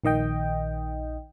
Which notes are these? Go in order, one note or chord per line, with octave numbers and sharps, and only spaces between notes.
A#1 D#3 D#5 G5